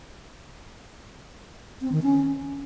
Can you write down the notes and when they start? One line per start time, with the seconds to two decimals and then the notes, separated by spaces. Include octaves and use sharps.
1.81 C4
1.92 D#3
2.03 C#4